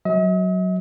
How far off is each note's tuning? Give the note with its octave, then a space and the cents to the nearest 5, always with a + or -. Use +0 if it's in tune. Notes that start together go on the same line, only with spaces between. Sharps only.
F#3 +5 D#5 +45